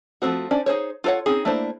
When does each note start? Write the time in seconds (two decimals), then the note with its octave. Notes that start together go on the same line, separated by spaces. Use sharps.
0.22 F3 G3 A3 C4 F#4
0.51 C#4 D4 C5 D5
0.66 D#4 G#4 C5 C#5
1.04 F4 A4 A#4 C#5 F#5
1.26 C4 C#4 D#4 G#4
1.45 A3 A#3 D4 E4 C5